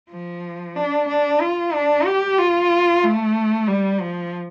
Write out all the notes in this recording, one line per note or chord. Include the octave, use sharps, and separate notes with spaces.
F3
D4
D4
F4
D4
G4
F4
A3
G3
F3